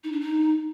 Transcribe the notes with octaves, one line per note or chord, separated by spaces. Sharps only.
D#4
D4
D#4